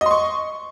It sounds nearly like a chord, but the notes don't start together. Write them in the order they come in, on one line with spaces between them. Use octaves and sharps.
D#5 C6 C#6